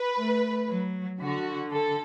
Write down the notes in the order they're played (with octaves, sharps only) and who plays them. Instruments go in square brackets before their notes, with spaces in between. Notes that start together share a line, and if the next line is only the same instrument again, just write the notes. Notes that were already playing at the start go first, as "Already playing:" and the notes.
Already playing: [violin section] B4
[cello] A3
F#3
[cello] D3 [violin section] F#4
[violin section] A4